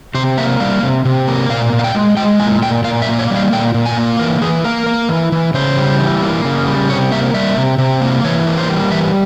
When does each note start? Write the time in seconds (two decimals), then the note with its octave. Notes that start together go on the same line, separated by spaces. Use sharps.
0.15 C3 C5
0.37 A#3 E5
0.60 G3 F5
0.83 C3
1.05 C3
1.27 A#3
1.49 A#2 F5
1.73 A#2
1.79 F5
1.84 G5
1.95 G#3
2.17 G#3 G5
2.40 A#2 G#5
2.62 A#2 G5
2.84 A#2 F5
3.02 E5
3.07 A#3
3.19 C#5
3.30 G3
3.36 F5
3.52 A#2 G5
3.74 A#2
3.86 G#5
3.97 A#3
4.19 E3 A#4
4.42 E3 G#4
4.64 A#3 A#4
4.86 A#3
5.09 E3
5.32 E3
5.54 C#3 C5
5.77 G3
5.99 E3
6.22 A#3
6.45 C#3
6.67 G3
6.89 C3 C#5
7.11 A#3 E5
7.34 G3 E5
7.57 C3
7.78 C3
8.01 A#3
8.24 E3 C#5
8.47 A#3
8.58 C5
8.69 G3
8.91 E3 E5